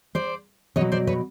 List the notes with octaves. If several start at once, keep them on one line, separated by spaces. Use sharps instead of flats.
C5 D5
B2 F#3 C#5 D#5
C5 D5
B4 C#5